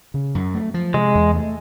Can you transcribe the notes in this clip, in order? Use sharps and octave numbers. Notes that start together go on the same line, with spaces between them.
C#3
F#2
A3
F3
C3 G#3
E2
A3